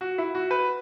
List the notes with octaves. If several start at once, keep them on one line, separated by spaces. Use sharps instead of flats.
F#4
E4
F#4
B4